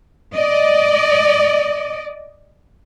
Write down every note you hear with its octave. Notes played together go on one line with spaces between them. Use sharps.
D5 D#5